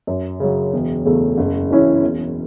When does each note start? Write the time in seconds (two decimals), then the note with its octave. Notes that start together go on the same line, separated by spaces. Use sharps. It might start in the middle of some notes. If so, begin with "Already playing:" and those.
0.07 F#2
0.40 C#3 F#3
0.73 E1
1.05 E2 C#3 A3
1.38 F#1
1.70 F#2 E3 C#4 E4
2.03 E1